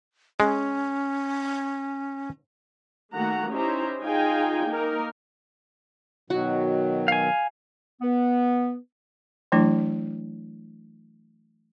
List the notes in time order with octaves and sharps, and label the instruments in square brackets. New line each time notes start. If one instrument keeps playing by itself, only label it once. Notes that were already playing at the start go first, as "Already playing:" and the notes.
[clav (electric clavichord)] G#3 [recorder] C#4
[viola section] D#3 A3 A#3 F#4 F#5 A#5
C#4 D#4 E4 G4 C5 A#5
D#4 F4 G#4 F5 G5 G#5
A#3 D#4 A#4
[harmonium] B2 D#3 F#3 [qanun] F#4
[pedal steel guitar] F5 G#5
[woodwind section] B3
[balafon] E3 F#3 A3 D4 E4